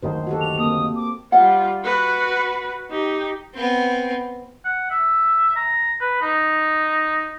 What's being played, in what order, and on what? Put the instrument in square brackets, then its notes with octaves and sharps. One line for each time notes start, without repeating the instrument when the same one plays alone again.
[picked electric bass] F#1 D2 D#3 [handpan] C5
[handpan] F#4 G4 A4
[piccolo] F7
[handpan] A#3 C4 [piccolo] D#6
[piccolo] D6
[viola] G3 F4 [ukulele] F#5
[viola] F#4 B4
D#4 G4
[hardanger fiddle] B3 C4
[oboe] F#5
E5
A#5
B4
D#4